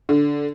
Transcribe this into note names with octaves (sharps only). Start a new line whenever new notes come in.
D3